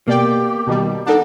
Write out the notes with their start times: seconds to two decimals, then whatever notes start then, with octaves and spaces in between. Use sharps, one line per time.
0.08 B2 A#3 G4 D5 G5
0.67 B2 D#3 G3
1.06 D4 D#4 A4 F#5